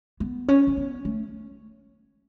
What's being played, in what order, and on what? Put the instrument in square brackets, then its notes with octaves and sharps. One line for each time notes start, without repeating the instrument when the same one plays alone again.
[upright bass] B3
C#4
C#4
B3
A3